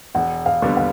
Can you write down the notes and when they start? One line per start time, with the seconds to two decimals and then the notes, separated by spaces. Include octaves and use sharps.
0.15 E1 F#5
0.46 F5
0.62 D#2 D3 G3 B3
0.77 F5